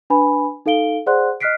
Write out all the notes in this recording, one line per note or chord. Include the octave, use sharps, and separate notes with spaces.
D4 B4 G#5 B5
D#4 A4 F5 D7 G7
G#4 C5 D5 F#5 C6 F#6
D#5 F6 F#6 B6 C7 D7